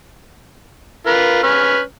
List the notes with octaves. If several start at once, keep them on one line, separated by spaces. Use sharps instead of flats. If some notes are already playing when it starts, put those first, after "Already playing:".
F4 A#4 B4
C#4 B4 F6